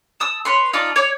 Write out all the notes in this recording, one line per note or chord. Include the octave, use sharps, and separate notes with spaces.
A5 D#6 E6
B4 C#5 C6
D#4 F4 D5 A5
C#5 D5 D6